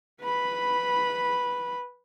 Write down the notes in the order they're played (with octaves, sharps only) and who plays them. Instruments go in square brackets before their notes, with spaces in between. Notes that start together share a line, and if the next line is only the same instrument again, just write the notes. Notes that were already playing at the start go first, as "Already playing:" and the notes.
[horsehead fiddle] B4 B5